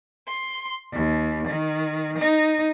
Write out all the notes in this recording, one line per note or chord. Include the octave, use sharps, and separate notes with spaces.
C6
D#2
D#3
D#4